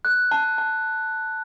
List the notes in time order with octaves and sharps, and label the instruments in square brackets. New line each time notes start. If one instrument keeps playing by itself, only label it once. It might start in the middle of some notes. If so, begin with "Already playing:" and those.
[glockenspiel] F#6
A5
A5